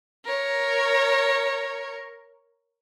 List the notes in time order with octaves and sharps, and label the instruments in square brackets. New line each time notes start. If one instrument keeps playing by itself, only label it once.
[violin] A#4 C#5